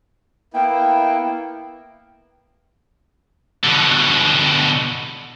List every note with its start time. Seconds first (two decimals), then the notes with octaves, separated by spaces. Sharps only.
0.54 A#3 B3 E4 G5
3.64 B2 D3